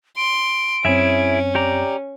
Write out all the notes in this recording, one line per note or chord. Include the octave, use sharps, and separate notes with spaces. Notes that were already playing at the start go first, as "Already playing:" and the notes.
C6 D7
F#2 C4 C#4 E4 G#4 E5
G4 D5 A#5